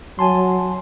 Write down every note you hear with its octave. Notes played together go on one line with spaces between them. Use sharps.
F#3 G#5 A5 C6